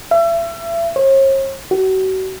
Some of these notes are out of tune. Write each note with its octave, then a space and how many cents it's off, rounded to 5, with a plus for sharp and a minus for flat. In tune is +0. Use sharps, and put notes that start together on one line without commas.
E5 +35
C#5 -45
F#4 +35